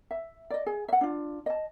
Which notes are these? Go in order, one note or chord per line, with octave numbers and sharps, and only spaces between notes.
E5
D5 D#5
G#4 G#5
E5 F#5
D4 F4
D#5 A5